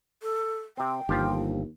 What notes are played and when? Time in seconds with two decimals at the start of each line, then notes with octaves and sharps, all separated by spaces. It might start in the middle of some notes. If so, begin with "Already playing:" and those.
0.22 A4
0.77 C3 C4 G5
1.09 G1 D#2 F3 F4 G4